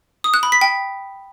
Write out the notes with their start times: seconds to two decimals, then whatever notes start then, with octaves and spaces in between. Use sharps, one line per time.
0.24 D#6
0.34 F#6
0.43 B5
0.52 B6
0.61 G5